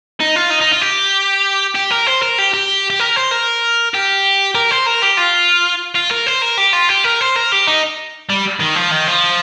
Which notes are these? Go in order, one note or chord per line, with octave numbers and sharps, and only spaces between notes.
D#4
F4
D#4
D#4
F4
G4
G4
A#4
C5
A#4
G4
G4
G4
A#4
C5
A#4
G4
A#4
C5
A#4
G4
F4
F4
A#4
C5
A#4
G4
F4
G4
A#4
C5
A#4
G4
D#4
G3
D#3
F3
D#3
F3